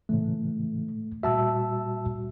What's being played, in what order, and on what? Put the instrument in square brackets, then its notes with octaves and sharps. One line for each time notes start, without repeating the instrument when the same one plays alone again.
[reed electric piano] A2 C#3 E3 [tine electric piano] A3
[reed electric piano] A#2 G3 F#4 [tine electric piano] E5 A5 E6